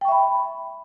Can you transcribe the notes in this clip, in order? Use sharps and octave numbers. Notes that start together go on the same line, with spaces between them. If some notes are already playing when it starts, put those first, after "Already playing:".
E5 G5 B5 C#6